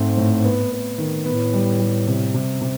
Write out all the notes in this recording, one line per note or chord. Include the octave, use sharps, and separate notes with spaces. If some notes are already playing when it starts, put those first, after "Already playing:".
Already playing: G#2 A3 C4
A2
B3
B3
D#3
A2 B3
G3
G3
C3
C3
C3